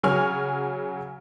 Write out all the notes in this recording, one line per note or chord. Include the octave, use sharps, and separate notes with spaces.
C#3 F#3 G#5 C#6 F6